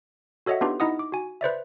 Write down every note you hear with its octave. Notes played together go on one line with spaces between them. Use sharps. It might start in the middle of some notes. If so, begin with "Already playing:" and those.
F#4 A4 C#5 D#5 E5 F#5
B3 D4 D#4 F4 G4 B4
D#4 E4 D#5 F#5 D#6
D6
F#4 G#5
B4 C5 D5 E5